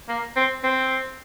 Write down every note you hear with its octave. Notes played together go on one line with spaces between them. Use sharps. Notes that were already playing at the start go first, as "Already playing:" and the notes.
A#3
C4
C4